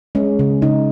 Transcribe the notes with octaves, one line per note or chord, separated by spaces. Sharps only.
G#3 C#4
C#3
C#3 D#4